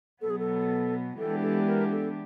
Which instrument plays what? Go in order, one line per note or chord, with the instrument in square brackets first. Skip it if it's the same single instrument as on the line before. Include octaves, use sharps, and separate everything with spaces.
[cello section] B2 F#3 B3 [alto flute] A4
[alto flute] G#4
A4
[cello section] E3 G#3 B3 D4 G4 [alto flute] A4
[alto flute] A4
A#4
A4